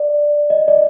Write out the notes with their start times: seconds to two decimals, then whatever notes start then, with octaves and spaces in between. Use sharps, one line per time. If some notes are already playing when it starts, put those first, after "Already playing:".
Already playing: D5
0.50 D#5
0.68 D5